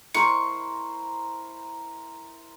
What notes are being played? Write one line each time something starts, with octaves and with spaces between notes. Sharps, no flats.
E4 A#4 C5 C#6